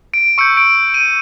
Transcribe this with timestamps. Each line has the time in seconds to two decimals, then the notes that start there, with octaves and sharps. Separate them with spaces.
0.14 D7
0.38 C#6 E6 G6 C#7
0.57 D7
0.75 D7
0.94 D#7